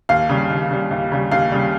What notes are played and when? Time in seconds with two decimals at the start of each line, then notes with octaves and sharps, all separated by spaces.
0.09 D#2 F5
0.29 C#3 G3
0.50 D#2
0.71 C#3 G3
0.91 D#2
1.12 C#3 G3
1.31 D#2 F5
1.52 C#3 G3